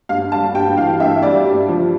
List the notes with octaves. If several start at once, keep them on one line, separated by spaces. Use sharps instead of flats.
G2 F5
G3 A5
G2 G5
E3 F5
G2 E5
G3 D5
G2
F3